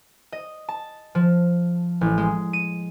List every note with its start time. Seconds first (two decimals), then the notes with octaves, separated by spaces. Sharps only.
0.32 D#5
0.69 A5
1.15 F3
2.01 A1
2.18 G#3
2.53 D#7